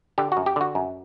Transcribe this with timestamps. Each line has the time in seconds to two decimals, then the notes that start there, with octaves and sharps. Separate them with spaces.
0.18 D3 G4
0.32 F#4
0.37 F#2
0.46 G4
0.56 D3 F#4
0.75 F#2